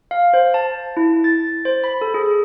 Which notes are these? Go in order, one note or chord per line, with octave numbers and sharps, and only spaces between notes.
F5
C5
A5
E4
A6
C5
B5
A4
G#4